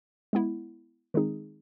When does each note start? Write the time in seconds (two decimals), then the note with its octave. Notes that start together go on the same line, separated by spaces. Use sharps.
0.33 G#3 B3 E4
1.14 D#3 G#3 C4 D#4 G#4